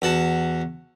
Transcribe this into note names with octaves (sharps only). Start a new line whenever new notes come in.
E2 F#4 A5